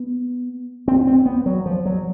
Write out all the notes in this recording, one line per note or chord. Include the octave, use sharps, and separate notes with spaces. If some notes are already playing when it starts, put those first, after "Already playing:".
Already playing: B3
C4
C4
B3
F#3
F3
F#3